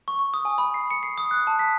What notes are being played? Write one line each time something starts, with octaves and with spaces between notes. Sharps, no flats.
C#6
C#6
D#6
G#5
B5
C7
C#7
C7
D#6
F#6
A5
B6